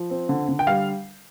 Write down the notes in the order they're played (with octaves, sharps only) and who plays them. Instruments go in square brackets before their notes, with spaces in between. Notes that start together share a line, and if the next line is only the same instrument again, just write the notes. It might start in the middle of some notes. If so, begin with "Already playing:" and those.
Already playing: [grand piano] F3
C4
D3
D3
G5
G3 F5